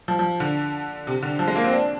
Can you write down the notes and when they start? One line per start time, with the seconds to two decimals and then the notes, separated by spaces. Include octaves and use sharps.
0.08 F3
0.19 F3
0.40 D3
1.07 C3
1.23 D3
1.39 F3
1.48 G#3
1.56 A#3
1.64 C4
1.73 D4